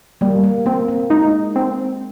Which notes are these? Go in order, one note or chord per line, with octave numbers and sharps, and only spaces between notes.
G3 A#3
A#3
A#3 C4
A#3
G#3 D#4
C4